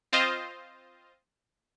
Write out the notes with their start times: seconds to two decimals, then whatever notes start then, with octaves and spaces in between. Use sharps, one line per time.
0.13 C4 F4 C5 D#5 F5